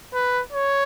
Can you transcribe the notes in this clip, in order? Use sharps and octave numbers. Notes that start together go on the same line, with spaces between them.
B4
C#5